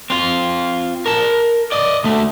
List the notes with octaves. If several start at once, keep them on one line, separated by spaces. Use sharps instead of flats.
C4 F4
A#4 A5
D5 D#5
D2 A3